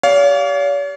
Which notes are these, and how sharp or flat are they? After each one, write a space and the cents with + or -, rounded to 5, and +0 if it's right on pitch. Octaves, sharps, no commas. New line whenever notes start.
G4 +0 C#5 +45 F5 +0